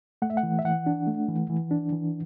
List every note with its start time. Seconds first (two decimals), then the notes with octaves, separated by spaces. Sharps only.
0.22 A3 F#5
0.30 E5
0.37 F#5
0.43 E3
0.59 E5
0.65 E3 F#5
0.86 D4
1.07 A3
1.28 E3
1.50 E3
1.71 D4
1.92 E3